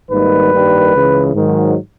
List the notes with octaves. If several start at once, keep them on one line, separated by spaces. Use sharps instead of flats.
G#1 G#2 D#3 G3 A#3 B4
G2 D#3 G3 A#3
C#2 C#3 E3
G#2 D#3 F#3